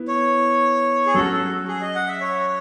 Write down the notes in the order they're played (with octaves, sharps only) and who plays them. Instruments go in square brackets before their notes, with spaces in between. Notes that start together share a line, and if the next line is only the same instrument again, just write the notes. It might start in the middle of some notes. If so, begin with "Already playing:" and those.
Already playing: [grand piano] B3 E4
[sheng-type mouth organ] C#5
G#4
[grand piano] F#3 C#4 F#4 [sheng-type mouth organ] A4
[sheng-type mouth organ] A4
G#4
D#5
F#5
E5
C#5